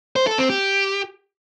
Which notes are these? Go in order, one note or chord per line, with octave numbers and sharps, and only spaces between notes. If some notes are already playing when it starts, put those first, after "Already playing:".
C5
A4
C4
G4